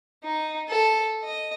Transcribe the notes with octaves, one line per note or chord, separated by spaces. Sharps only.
D#4
A4
D#5